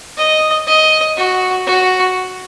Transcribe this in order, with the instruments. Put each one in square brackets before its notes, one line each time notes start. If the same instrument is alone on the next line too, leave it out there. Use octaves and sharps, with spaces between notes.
[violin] D#5
D#5
F#4
F#4